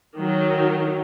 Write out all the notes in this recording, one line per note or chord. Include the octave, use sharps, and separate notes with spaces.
D#3 F#3